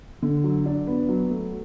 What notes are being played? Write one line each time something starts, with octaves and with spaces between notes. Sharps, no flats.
D3
F#3
D4
B3
F#3
A3